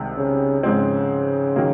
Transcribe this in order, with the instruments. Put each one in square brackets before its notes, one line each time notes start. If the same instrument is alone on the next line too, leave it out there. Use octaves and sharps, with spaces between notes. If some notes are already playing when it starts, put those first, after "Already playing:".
Already playing: [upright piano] C2 C3 D#3 G#3
[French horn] C#3
[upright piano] G#2 F3 G#3 C4 [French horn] C#3
[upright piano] D#3 F#3 A#3